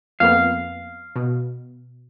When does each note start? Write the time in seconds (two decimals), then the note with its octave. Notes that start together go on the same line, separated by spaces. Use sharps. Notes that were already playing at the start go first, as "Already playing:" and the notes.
0.20 F2 A#3 B3 F5
1.16 B2